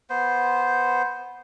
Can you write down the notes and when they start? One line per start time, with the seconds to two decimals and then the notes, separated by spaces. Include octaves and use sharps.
0.10 B3 C5